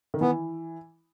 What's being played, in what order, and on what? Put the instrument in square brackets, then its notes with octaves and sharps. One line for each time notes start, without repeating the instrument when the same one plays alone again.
[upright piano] D#3
[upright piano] E3 [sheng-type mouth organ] B3